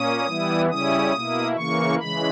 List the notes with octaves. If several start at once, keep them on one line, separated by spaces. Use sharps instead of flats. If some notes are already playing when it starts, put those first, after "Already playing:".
Already playing: A#2 A#3 C#4 D#6
E3 G3 B3 E4
C#3 G3 C#4 E4 D#6
B2 A#3 E4
C#3 E3 A#3 C#6
C#3 E3 G#3 B5